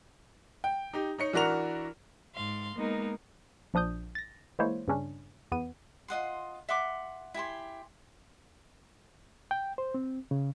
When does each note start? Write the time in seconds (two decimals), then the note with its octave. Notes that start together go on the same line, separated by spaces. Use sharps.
0.64 G5
0.93 D#4 G4
1.18 D#4 C#5 C#7
1.33 E3 D4 F#4 A#4 F7
2.34 G#2 F5 C6
2.77 G#3 A#3 B3 D#4 A#4
3.74 A#1 F3 D4 D#6 G6
4.15 A6 A#6
4.59 E3 G#3 A#3 E4 C5 C#5
4.88 G2 C#3 C#4 D4
5.52 E2 B3 D#7
6.08 F4 D#5 F#5 C6
6.69 E5 F#5 C6 D6
7.34 E4 G4 G#5 C6
9.51 G5
9.78 C5
9.94 C4
10.31 C#3